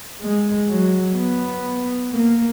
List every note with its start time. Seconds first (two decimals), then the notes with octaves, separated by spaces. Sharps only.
0.21 G#3
0.68 F#3
1.16 B3
2.12 A#3